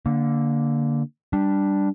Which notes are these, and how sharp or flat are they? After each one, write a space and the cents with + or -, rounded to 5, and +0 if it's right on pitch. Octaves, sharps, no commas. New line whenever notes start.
D3 -10 A#3 +0
G3 +0 D4 +0